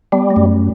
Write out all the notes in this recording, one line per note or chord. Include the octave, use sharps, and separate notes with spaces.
G3 B3
A3
F#2